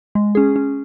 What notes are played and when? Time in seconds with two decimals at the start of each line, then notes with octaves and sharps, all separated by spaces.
0.15 G#3
0.35 C#4 G#4
0.56 C#4